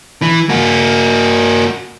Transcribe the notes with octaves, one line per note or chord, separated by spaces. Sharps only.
E3
A#3 F#4